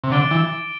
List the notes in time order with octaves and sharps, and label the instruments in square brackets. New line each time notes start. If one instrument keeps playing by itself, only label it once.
[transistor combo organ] C3
[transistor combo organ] D3 [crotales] D6 A6 D7 G7
[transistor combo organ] E3